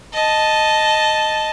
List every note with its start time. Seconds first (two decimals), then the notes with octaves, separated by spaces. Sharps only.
0.14 D#5 A5